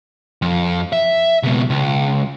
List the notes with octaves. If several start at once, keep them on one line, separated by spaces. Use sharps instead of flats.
F2
E5
C#2 B2
C#2